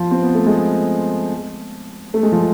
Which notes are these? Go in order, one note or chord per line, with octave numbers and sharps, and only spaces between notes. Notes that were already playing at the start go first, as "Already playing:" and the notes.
Already playing: F3
C4
B3
A3
G#3
A3
G#3
F3